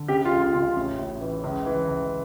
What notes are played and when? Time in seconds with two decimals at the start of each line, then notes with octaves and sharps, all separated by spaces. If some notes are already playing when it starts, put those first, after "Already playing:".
Already playing: D3
0.08 C#3 G4
0.25 F4
0.31 C#2
0.42 F4
0.53 C#3
0.59 F4
0.76 A1
0.98 A2
1.21 E3
1.44 C#2
1.66 E3
1.88 C#2